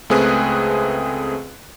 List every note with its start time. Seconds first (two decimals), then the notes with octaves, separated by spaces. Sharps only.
0.10 C#2 A3 C4 G#4 B4 F#6